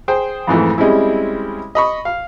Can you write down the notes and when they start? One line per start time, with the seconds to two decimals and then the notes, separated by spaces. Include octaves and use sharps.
0.08 G#4 C5 G5
0.47 F2 G#2 E3 A3
0.78 G3 G#3 C4 C#4 E4
1.75 D#5 B5 C#6
2.05 F5